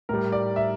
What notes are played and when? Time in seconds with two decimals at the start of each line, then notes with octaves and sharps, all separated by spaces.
0.09 A2 G3 A#4
0.32 D5
0.56 E5